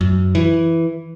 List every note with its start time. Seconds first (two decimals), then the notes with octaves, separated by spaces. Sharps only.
0.01 F#2
0.35 E3